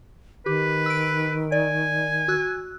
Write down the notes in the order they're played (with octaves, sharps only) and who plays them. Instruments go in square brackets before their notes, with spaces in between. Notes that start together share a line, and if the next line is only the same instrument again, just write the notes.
[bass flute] D#3 [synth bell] G4 [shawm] B4
[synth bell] E6 D7
[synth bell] D5 [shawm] G#5
[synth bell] F#4 E6 F#6